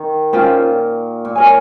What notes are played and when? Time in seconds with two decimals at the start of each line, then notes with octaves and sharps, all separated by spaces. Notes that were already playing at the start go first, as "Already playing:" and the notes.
Already playing: D#3
0.33 A#2 C#4 F4 C5 G5
1.25 A#2
1.35 A#4 C#5 G#5